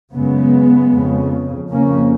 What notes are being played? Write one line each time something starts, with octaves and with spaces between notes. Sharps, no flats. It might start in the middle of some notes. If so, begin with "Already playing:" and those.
F#2 C#3 G#3 B3
F2 C#3
F2 C#3 A#3 C#4